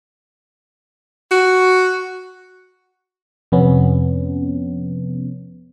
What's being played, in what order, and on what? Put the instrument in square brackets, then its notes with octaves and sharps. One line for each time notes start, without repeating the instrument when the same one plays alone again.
[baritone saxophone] F#4
[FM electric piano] F2 C3 B3 C#4